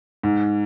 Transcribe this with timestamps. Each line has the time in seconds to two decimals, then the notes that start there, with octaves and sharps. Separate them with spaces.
0.23 G#2